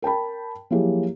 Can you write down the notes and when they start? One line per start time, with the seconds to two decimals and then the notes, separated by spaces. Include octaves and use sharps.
0.02 A#4 G5 A5 B5
0.70 F3 F#3 A#3 E4 G4 G#4